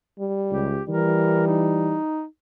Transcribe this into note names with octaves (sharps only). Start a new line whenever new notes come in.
G3
C#2 G4
E3 G3 A#4
D#4